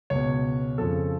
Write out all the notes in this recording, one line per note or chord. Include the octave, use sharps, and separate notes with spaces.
C#2 B2 C#5
F2 C#3 F3 A4